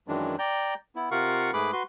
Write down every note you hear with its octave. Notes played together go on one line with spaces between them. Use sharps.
F#2 D#3 E3 F#3 G#3 D4
D5 G5 A#5 G6
B3 E4
C3 F4 A#4 F5 F#5 C#6
G#2 A3 G#4 B4 B5 D6
F#4 B4 C6